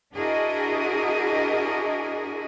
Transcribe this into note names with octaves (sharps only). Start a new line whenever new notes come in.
D4 E4 F#4 G#4 A#4 D#5